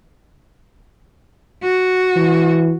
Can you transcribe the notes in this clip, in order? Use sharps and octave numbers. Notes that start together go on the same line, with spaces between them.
F#4
E3